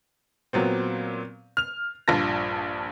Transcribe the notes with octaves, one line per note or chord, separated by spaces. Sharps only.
A#2 F#3 B3 C4
F6 F7
A#1 G2 F4 A5 A#6